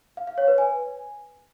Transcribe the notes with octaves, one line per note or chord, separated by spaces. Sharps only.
F5
F5
C#5
B4
G#5